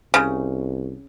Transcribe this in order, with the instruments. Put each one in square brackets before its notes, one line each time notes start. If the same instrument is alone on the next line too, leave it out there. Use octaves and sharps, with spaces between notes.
[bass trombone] C2 [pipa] C#3